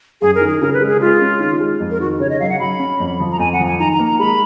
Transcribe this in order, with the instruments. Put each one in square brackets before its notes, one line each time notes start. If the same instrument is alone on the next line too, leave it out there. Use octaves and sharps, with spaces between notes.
[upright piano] F#2 [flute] G#4
[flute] A#4
[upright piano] D#3
[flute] G#4
[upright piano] C#3 [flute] A#4
[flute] B4
[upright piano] G#3
[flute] G#4
[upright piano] G#3 [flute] F4
[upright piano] C#4
D#3
G#3
F2
[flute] A#4
[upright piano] D#3 [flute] F#4
[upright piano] C#3 [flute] C#5
[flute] D#5
[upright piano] F#3 [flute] F5
[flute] F#5
[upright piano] F#3 [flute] B5
[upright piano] C#4
F2
F3
[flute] A#5
[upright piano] F2 [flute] G#5
[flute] F#5
[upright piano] F3
[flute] G#5
[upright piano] D#3 [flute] A#5
[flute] A#5
[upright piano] A#3
[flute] A#5
[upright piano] G#3 [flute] B5